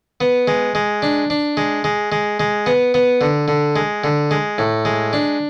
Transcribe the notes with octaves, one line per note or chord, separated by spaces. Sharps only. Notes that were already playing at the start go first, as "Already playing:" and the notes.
B3
G#3
G#3
D4
D4
G#3
G#3
G#3
G#3
B3
B3
D3
D3
G#3
D3
G#3
A2
G#3
D4